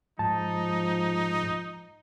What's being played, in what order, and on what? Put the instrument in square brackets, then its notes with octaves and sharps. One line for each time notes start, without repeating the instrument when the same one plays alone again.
[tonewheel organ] G#2 [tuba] F3 [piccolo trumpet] D#4 [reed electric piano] A5